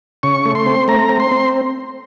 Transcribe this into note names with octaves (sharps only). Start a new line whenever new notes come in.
C#3 C#6
A3
C6
C4
A3 A#5
C4
C6
C4